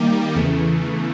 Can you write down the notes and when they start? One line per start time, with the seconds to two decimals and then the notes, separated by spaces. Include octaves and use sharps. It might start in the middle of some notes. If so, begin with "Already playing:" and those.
Already playing: D#3 G3 A#3 D#4 G4
0.35 E2 C#3 E3 A3